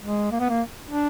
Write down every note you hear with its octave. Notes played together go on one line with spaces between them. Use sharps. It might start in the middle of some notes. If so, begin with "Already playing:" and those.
G#3
A#3
B3
A#3
D4